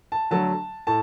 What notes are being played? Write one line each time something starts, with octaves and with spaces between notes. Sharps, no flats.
A5
D3 F#3 A3 A5
A2 A5